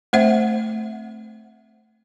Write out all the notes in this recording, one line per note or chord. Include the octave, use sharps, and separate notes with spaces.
A3 C4 C5 E5 F#5